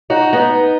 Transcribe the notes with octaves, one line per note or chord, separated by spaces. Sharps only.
D#4 F#4
B3 D#4